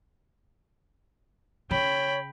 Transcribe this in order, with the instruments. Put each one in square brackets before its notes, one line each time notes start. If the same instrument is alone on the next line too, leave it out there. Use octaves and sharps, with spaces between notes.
[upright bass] C#3 [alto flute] C#5 [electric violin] G5 B5